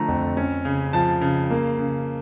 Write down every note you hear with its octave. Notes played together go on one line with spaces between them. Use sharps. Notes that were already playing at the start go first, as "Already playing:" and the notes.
Already playing: D3 F3 A3 A#5
F2
C#4
C#3
F3 A5
C#3
A#3
C#3